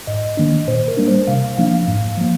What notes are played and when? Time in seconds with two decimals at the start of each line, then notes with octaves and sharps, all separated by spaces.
0.07 G#2 D#5
0.37 D#3 A#3 D4
0.68 A#2 C5
0.88 A#4
0.97 G3 A#3 D4
1.08 C5
1.27 C3 F5
1.58 F3 A#3 D4 F5
1.88 G#2
2.18 F3 A#3